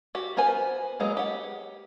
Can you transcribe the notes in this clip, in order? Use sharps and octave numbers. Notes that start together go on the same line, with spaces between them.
F#4 G4
B3 A#4 C5 G#5
F#3 G#3 A#3 B3
G4 F#5